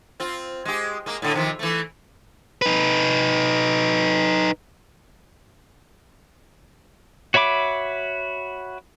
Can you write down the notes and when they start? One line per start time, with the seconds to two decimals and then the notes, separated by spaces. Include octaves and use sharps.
0.20 C4 F4
0.65 G#3 G4
1.06 G#3 A#3
1.22 A2 D3
1.34 C3 D#3 F3
1.59 E3 A3
2.62 D#4 B4
7.34 F#4 C#5 E5 B5 D6